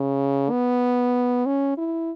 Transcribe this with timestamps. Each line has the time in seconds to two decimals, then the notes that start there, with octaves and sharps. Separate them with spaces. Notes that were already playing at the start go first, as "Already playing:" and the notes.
Already playing: C#3
0.50 B3
1.46 C#4
1.78 E4